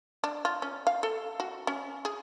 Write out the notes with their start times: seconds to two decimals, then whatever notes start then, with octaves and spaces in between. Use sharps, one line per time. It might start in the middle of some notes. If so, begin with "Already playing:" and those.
0.24 D4
0.45 F4
0.62 C#4
0.87 F5
1.03 A4
1.40 F#4
1.67 C#4
2.05 G#4